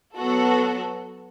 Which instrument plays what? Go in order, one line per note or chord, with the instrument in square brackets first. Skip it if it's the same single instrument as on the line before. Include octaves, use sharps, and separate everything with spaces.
[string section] F#3 B3 F#4 A4